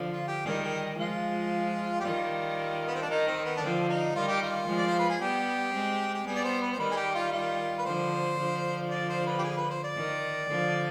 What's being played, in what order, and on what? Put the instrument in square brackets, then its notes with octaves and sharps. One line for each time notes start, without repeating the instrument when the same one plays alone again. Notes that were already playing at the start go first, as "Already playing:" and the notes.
Already playing: [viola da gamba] D3 F3
[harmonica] F4
G4
[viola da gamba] D#3 G3 [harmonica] G#4
[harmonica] G#4
[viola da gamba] F3 G#3 [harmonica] F4
[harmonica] G4
[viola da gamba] D#3 G3 [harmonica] F4
[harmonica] B3
C4
D4
[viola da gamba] D#3 [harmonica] D#4
[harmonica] C4
B3
D4
[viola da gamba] D3 F3 [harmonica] C4
[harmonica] D#4
[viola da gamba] D#3 G3 [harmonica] F4
[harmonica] G4
F4
[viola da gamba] F3 G#3
[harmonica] D5
C5
B4
G#4
[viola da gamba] G3 B3 [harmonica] G4
[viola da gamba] G#3 C4
[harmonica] G4
[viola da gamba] G3 B3 [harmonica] G#4
[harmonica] D5
C5
B4
C5
[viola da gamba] D#3 G3 [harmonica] B4
[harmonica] G#4
G4
F4
F4
B4
[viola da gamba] D3 F3 [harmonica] C5
[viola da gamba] D3 F3
[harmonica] D5
C5
B4
G4
G#4
B4
C5
D5
[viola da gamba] D#3
D3 F3